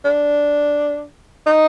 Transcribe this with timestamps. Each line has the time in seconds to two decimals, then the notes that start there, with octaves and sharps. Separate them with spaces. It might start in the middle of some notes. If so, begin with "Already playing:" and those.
0.04 D4
1.46 D#4